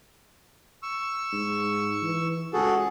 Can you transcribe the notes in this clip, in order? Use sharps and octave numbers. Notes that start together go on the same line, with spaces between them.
C#6 E6
G#2
E3
C#2 F#4 G#4 A4